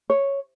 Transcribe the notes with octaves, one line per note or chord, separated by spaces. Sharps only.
C#5